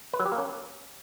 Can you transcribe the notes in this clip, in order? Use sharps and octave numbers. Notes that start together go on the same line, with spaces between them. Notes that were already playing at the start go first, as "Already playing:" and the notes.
B4
F#3
G4
A#3
C#4